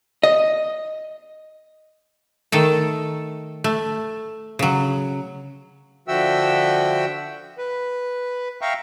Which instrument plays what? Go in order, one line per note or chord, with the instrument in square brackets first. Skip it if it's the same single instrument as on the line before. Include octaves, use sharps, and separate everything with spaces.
[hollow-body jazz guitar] D#5
[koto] D#3 A3 A4
A3
C#3 F#3
[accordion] D3 F3 F#4 E5 G5 E6
B4
E5 F5 G5 A#5 C#6